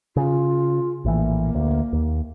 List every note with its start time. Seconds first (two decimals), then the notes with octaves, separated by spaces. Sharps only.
0.16 C#3 F4
1.05 A#1 A2 E3 A#3
1.55 D2
1.93 D#2